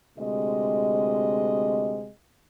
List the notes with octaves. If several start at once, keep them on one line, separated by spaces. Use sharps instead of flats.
D2 C3 G#3 D#5